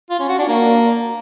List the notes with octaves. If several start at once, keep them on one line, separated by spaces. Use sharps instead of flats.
F4
C#4
F#4
D4
A#3